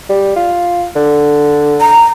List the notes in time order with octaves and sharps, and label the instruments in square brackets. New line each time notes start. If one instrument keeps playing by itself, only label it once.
[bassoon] G3
F4
D3
[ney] A#5